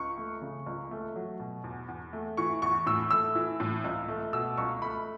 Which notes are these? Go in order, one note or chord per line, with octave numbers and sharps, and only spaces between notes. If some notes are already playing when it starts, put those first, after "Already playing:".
Already playing: C#2 C#6
A3
C#3
C#2
A3
F#3
B2
E2
E2
A3
E3 C#6
E2 C#6
A2 E6
A3 E6
E3
A2
C#2
A3
B2 E6
C#2 C#6
A3 B5